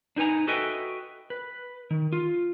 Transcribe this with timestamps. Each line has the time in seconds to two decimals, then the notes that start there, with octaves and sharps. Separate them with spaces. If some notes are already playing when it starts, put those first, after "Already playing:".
0.16 D4 D#4 B4 G#5 A#5
0.48 F#4 A4 B4 D#5 E5 G5
1.30 B4
1.91 D#3
2.13 F4